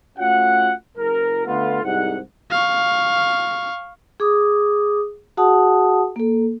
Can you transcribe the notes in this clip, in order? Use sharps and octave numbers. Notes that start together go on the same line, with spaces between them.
A3 C#4 F4 F#4 F#5
F#1 A#4
D3 A3 B3 F4
C2 G#2 F#5
F5 C#6
G#4 D6 D#6
F#4 G#4 F#5 A5 D#6
A#3 A4